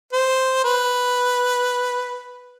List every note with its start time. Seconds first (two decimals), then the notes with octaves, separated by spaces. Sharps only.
0.13 C5
0.64 B4